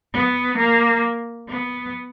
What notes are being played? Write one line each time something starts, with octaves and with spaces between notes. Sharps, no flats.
B3
A#3
B3